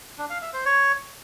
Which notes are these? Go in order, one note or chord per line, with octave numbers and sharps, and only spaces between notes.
D4
F5
E5
C5
C#5